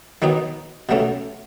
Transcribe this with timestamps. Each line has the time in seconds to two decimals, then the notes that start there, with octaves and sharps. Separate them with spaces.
0.22 D#3 F#3 B3 D#4
0.89 B2 F#3 A3 C#4